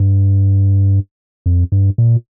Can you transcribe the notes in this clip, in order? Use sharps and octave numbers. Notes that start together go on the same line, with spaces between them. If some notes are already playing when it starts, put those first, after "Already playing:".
Already playing: G2
F2
G2
A#2